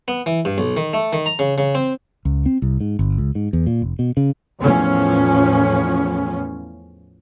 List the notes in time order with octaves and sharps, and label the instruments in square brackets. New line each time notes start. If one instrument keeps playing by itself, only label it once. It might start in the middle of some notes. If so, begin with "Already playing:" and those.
[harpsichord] B3
E3
G2
B1
D#3
A3
D#3
A#5
C#3
C#3
C4
[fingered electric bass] C#2
C4
C2
G#2
G1
C#2
G#2
E2
A#2
F1
B2
C#3
[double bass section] E2 A2 F3 C#4